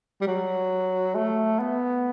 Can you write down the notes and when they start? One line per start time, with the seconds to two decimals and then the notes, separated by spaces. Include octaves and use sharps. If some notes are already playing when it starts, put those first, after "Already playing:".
0.21 G3
0.27 F#3
1.15 A3
1.59 B3